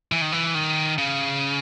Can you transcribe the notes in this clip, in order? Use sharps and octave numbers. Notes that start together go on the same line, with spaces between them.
E3
D#3
E3
D#3
C#3